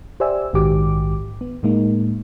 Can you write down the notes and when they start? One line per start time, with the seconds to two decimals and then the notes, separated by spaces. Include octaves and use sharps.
0.20 G4 C5 D5 E5 G#5 E6
0.53 A#1 G#2 D#3 F#4 G4 D6
1.41 B3
1.63 A2 G#3 A#3 D#4